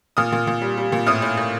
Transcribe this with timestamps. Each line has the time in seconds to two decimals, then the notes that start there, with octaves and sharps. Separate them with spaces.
0.17 A#2 D#6 F6
0.32 A#2
0.47 A#2
0.62 G3
0.77 G3
0.92 A#2
1.06 A2 D#6 F6
1.22 A2
1.37 A2